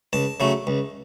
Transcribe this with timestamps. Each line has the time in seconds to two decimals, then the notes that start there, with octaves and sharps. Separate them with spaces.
0.13 C#2 A5
0.40 C#3 F#3 A3
0.67 C#2